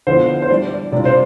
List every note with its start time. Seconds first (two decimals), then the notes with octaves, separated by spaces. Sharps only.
0.07 D3 F3 B3 E4 C5
0.42 C5
0.50 E3 G3 D4 D5
0.71 D5
0.92 C3 G3 D4 F4 D5
1.05 C5